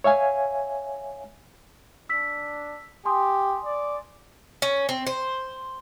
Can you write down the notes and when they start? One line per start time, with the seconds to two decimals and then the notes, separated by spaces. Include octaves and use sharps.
0.04 C#5 E5 F5 G#5
2.09 D4 E6 B6
3.05 G4 G#5 C6 D#6
3.65 D5
4.62 C#4
4.89 C4
5.07 C5